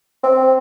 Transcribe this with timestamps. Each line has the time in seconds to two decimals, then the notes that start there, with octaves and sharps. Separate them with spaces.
0.24 C4